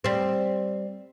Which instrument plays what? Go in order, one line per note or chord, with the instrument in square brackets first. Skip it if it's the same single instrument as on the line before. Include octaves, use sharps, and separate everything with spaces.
[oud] G3 C4